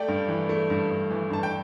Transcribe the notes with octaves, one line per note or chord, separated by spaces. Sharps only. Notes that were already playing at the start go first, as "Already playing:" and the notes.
Already playing: A3 D5 G5
G2
E3
A3
G2
G2
E3
G2 A5
G5